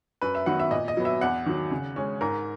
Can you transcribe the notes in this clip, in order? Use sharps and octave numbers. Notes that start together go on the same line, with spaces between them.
F#2 B4
E5
D#3 F#3 B3 F#5
E5
A#2 D#5
D#5
F#3 B3
E5
E2 F#5
D#3 F#3
C#3
G#3 C#4
G#2 A#4